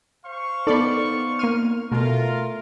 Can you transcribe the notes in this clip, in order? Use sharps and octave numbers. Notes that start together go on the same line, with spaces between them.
C5 F5 C#6
B3 D#4 A4 D5 B5
A#3 C6 F6 D#7
B2 A3 F4 A#4